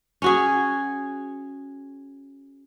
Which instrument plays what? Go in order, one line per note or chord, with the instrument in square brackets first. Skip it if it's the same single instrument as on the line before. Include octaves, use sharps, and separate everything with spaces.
[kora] C#4 F#4 G#4